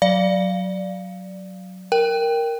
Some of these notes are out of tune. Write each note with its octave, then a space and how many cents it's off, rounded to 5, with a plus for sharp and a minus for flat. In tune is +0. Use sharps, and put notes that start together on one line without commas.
F#3 +0 D5 +0 F5 -5
A#4 +0 G5 +0